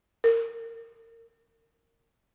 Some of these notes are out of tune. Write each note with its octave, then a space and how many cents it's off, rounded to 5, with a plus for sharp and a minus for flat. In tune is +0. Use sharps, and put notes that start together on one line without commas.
A#4 -25